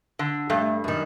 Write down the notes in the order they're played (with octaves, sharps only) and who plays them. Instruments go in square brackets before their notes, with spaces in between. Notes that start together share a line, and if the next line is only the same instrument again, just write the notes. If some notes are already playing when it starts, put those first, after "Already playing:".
[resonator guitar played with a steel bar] D3
[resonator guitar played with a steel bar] G2 [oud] A3
[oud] F#2 D#3